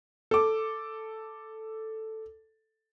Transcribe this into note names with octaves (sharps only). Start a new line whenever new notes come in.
A4 D6